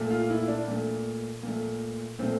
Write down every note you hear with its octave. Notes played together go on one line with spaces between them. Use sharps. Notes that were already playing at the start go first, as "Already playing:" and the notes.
Already playing: A#2 A3
F4
E4
D4
A#2 A3
A#2 A3
A#2 A3 C4